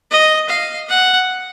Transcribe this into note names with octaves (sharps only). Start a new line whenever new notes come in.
D#5
F5
F#5